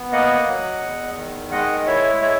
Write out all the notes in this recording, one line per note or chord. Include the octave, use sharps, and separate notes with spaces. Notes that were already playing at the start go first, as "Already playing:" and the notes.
Already playing: B3
A#3 D#5 F#5
F#3
E2
D#3
G#3 D#5 F#5
E4 C#5 E5
G#3 C#5 E5